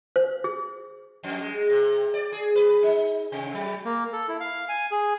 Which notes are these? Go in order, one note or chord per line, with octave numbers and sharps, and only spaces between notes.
C5
G#4
F2
G#3
C3
D5
G#4
B4
D#4
C3
F#3
A#3
A4
E4
F5
G#5
G#4